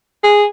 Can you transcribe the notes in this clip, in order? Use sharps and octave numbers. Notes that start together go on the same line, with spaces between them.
G#4